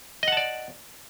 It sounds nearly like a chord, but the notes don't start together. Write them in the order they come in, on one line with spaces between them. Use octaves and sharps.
D#5 F#5 A5 D5